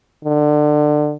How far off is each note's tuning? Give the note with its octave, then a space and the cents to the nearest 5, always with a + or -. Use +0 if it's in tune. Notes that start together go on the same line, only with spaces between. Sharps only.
D3 +25